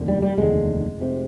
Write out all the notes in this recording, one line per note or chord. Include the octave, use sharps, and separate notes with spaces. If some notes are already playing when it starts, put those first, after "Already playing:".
Already playing: F1 D#2 D3
G3
G3
F1 D#2 D3 G#3
F1 F2 C3